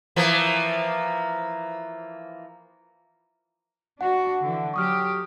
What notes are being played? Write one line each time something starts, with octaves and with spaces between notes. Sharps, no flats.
E3 F3 A#3
D4 F#4 F#5
D3 E3
F#3 G4 C#6 D#6 F6